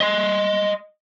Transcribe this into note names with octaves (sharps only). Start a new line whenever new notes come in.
D#5 C6